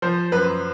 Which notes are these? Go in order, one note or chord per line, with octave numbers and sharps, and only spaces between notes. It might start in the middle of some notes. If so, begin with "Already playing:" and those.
F3 C5
F#2 B4